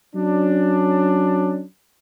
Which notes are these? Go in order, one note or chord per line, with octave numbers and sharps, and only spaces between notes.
F#3 C#4 D4